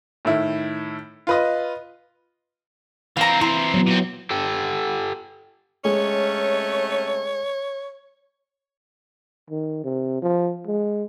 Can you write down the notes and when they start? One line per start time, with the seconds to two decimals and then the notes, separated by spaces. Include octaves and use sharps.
0.25 A2 D#3 E4
1.27 F4 B4 D#5
3.17 E3 C4 F5 A#5
3.41 E4 A#5 C6
3.74 F#3 B3
3.87 A#2 C4
4.31 G4 A4 G5
5.85 C3 G#3 A3 C#4 C#5
9.50 D#3
9.84 C3
10.22 F3
10.67 G#3